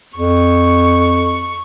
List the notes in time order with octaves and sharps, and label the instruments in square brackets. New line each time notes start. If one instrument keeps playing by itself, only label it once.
[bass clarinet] F2 [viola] C#6